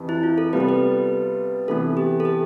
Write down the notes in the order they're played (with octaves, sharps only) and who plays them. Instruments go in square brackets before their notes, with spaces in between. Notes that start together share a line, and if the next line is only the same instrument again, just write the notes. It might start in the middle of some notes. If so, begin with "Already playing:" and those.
Already playing: [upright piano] F2 E3 G4
[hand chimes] E4
F4
A4
[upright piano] C3 G3 B3 F4 [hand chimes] B4
[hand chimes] A4
B4
[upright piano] C3 E3 B3 [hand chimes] A4
[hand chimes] G4
A4
G4